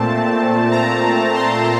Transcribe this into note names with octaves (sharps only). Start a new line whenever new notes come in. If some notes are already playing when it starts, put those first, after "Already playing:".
Already playing: A#2 A3 C4 A5
A#5
C6